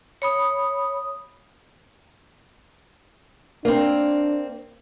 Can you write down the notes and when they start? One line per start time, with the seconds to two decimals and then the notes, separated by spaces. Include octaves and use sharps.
0.22 C#5 B5 D#6
3.65 A#3 C4 D4